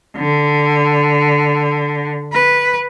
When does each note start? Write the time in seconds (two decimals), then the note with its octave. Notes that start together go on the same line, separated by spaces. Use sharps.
0.17 D3
2.32 B4